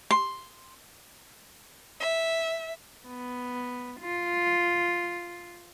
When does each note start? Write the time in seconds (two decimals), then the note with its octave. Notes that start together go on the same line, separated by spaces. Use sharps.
0.11 C6
2.01 E5
3.06 B3
4.01 F4